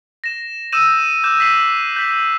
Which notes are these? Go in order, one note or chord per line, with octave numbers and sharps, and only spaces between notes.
A#6 E7
D#6 E6 G6 D#7 E7
D6 F#6 G6 E7
D#6 B6 C7 F#7
G6 B6 F#7